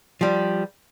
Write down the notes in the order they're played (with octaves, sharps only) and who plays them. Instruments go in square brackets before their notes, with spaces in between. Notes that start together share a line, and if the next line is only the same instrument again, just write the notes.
[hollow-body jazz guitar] F3 G3